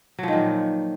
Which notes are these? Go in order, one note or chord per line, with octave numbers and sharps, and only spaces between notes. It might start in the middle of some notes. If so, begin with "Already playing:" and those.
A#2 D#3 F3 F#3